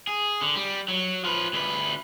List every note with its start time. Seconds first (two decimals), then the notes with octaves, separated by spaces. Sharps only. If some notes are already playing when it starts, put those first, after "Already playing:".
0.07 G#4
0.41 D3
0.55 G3
0.88 F#3
1.24 F3 B4
1.53 D2 B4